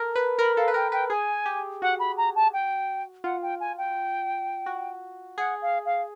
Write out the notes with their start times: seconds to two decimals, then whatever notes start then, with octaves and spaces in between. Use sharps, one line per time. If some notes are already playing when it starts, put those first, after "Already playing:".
Already playing: A4 A#4
0.16 B4
0.39 A#4 B5
0.57 A4 F5
0.68 B4
0.74 A#4 G5
0.92 B4 G5
1.10 G#4 G#5
1.46 G4
1.82 F#4 F#5
1.99 B5
2.17 A#5
2.35 A5
2.53 G5
3.24 F4 F#5
3.42 G5
3.60 G#5
3.78 G5
4.66 F#4
5.38 G#4 F#5
5.62 F5
5.85 F5